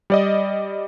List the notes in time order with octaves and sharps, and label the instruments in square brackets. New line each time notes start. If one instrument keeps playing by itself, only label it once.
[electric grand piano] G3 D5 D#5